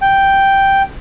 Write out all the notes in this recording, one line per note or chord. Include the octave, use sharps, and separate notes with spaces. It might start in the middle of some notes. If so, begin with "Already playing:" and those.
G5